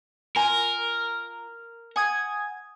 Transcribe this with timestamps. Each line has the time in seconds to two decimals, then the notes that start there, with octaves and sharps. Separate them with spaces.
0.36 F4 A#4 G#5
1.96 F#5 G#5 D#6 G#6